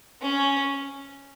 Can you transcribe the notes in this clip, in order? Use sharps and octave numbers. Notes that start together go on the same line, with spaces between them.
C#4